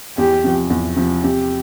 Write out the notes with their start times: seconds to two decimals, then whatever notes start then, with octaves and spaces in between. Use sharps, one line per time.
0.18 E2 G4
0.44 C3 F3
0.70 E2
0.96 C3 F3
1.23 C3 G4